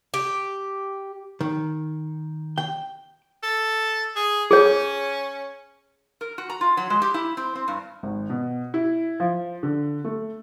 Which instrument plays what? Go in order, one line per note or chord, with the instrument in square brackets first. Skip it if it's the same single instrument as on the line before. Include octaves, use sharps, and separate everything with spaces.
[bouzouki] G4
[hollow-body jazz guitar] D#3
G5
[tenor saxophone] A4
G#4
[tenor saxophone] C#4 [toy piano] G#4 C#5
[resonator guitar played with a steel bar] A#4
F#4
A#5
F4
F#3
G#3
G4
E4
C4
C4
G2
[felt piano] G#1
B2
E4
F3
D3
A3